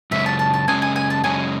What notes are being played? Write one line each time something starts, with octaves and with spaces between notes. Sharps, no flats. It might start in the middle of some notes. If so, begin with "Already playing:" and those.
F#2 C#3 G#3 C#4 E5
A5
A5
A5
F#2 C#3 G#3 C#4 G#5
G#5
G#5
A5
F#2 C#3 G#3 C#4 G#5